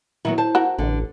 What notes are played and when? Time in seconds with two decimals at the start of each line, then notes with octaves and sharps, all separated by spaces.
0.25 D#3 F#3 B3 E4
0.38 C5 A5
0.55 F#4 A#4 F#5
0.78 A1 D3